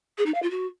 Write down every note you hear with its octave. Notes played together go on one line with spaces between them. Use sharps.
G#4
D#4
F5
F4
F#4